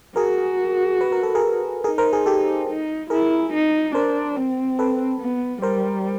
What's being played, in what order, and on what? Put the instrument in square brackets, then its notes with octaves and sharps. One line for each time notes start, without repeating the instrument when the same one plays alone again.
[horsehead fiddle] F#4 [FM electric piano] G#4 A#4
[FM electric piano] B4
A#4
A4
G#4 A#4
[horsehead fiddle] D#4 [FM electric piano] G#4 A#4
[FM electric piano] A#4 C5
G#4 A#4
G4 A4
[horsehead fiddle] D#4
[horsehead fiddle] E4 [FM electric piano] G#4 A#4
[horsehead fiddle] D#4
[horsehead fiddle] D4 [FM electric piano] A#4 C5
[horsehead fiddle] C4
[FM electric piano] A4 B4
[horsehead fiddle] B3
[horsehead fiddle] G3 [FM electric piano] A#4 C5